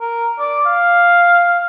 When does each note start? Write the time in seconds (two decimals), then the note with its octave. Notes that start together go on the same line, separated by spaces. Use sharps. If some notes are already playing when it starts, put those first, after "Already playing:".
0.01 A#4
0.39 D5
0.66 F5